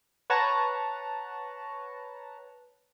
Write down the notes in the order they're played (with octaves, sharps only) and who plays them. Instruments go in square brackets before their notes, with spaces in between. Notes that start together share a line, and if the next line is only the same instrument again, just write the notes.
[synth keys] B4 C#5 F#5 A5 A#5